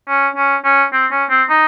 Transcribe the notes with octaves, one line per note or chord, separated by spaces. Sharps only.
C#4
C#4
C#4
C4
C#4
C4
D#4